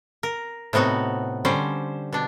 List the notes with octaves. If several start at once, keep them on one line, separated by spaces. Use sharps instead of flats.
A#4
A2 C3 B3 D#4 F#4
D3 G3 C#4 C5
B2 D4